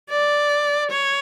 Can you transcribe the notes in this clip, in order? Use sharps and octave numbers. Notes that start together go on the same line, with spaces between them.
D5
C#5